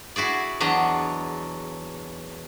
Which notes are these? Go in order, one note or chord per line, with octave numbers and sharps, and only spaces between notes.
E4 F#4 G#4 D5
E2 F#3 D4 D#5